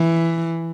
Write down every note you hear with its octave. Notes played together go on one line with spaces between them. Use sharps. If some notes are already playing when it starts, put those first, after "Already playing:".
Already playing: E3